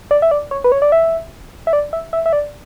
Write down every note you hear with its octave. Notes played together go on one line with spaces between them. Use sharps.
D5
E5
D5
C#5
B4
C#5
D5
E5
E5
D5
E5
E5
E5
D5